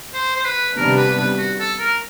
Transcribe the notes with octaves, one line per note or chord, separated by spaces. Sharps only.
C5
C5
B4
C3 D#3 G3 B3 D4 A#4
B4
B4
F#4
A4
A#4